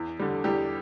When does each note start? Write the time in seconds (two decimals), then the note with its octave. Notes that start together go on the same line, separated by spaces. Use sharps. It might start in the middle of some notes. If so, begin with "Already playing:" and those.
Already playing: E2
0.19 D3 G3
0.44 E2 G3 G4